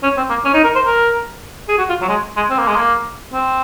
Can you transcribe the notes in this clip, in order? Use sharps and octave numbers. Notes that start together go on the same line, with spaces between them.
C#4
C4
A#3
C#4
D#4
A#4
C5
A#4
G#4
F#4
F4
F#3
G#3
G#3
C4
A#3
G#3
A#3
C4